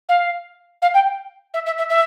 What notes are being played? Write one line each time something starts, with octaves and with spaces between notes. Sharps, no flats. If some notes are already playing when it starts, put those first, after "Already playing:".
F5
F5
G5
E5
E5
E5
E5